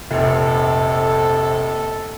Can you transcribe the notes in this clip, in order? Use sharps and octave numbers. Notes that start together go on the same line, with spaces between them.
F1 A#1 A4